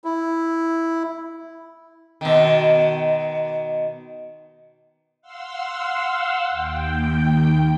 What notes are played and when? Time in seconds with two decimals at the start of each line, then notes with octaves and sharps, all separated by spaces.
0.04 E4
2.21 B2 D#3
5.22 F5 F#5 C6 E6
6.49 D#2 G5